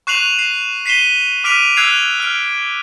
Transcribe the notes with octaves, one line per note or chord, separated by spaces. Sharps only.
C#6 F#6 C7 D#7 F7 F#7
C7
B6 C7 D#7 E7 G7
D6 F6 B6 D7 D#7 F7
E6 F#6 G#6 C7 F7
F6 D7